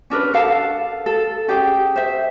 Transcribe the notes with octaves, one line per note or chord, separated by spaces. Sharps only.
C#4 D4 A#4 B4
A4 F5 A5
A4
C#4 G4 G#4 G5
C5 E5